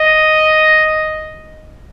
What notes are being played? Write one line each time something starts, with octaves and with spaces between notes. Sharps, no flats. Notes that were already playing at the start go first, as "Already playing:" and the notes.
Already playing: D#5